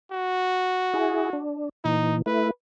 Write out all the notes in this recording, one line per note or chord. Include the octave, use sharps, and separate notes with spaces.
F#4
E4 G#4
D4
A#2 E3 D#4
A3 E4 B4